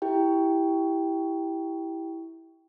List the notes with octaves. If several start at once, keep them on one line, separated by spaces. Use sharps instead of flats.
E4 G4 G5